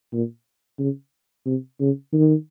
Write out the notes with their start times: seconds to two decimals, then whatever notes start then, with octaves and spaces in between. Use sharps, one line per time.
0.13 A#2
0.79 C#3
1.46 C3
1.80 C#3
2.13 D#3